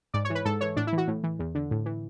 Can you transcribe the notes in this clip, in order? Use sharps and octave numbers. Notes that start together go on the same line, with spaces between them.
G#2 D5
C#5
E3
B4
G#2 A4
E3 C#5
A2 D4
E4
E3 F#4
A2
E3
E2
D3
A2
E3